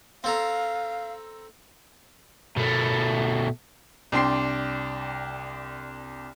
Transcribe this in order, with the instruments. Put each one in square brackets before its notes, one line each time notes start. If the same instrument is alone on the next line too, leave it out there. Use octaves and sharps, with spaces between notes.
[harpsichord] C4 A4 A#5 [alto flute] F5
[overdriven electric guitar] B2 A3
[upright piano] C2 D4 G5 C6 C7